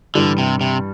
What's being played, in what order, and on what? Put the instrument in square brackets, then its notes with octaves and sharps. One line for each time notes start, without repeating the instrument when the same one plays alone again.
[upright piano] G2 E3 G3 [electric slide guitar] D3
[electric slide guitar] C3
C3